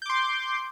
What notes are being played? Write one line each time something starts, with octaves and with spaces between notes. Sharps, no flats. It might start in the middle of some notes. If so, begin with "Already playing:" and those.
C6 D6 G6